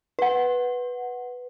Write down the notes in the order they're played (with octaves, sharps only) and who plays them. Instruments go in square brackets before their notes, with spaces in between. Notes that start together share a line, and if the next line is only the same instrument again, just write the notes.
[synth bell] B4 F#5